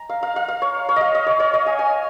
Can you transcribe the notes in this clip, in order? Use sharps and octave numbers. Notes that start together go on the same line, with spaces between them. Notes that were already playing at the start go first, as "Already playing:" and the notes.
Already playing: A#5
F5
F5
F5
F5
C#5
C#5
D#5 F5
D#5
C#5
C#5
D#5
G#5
G#5